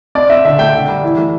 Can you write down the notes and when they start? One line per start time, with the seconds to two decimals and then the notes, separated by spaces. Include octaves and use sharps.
0.15 C4 D5
0.30 C4 E5
0.44 D3 E5
0.59 A3 G5
0.73 D3
0.88 G3
1.03 E3
1.18 A3